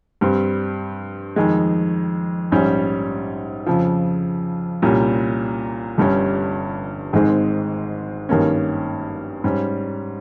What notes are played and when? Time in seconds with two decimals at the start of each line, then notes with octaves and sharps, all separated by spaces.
0.21 G2 G3 C4
1.36 F2 D#3 G#3
2.52 A#1 G#2 G3 C#4
3.66 F2 C#3 F3
4.82 C2 A#2 G3 C#4
5.98 G1 G2 G3 C#4
7.13 G#1 G#2 D#3 G#3 C4
8.29 G#1 G2 D#3 A#3 C#4
9.44 G#2 G3 C#4